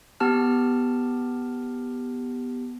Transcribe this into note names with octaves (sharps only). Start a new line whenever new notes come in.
B3 G4 A5 F6